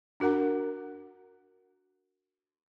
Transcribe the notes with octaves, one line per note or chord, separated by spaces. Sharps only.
D4 F#4 A#4 F#5 A#5